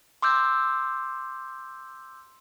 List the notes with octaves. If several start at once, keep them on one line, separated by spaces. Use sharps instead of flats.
C6 D6 E6 G6